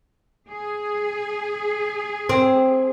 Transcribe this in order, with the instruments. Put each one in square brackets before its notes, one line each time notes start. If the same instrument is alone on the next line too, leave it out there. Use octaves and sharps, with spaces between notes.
[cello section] G#4
[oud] C4